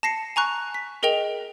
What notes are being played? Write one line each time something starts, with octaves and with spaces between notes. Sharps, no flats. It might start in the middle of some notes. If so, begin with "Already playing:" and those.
A5 A#6 C7 C#7
G#5 A#5 C#6 F#6
B6
G#4 A#4 D#5 G5 F7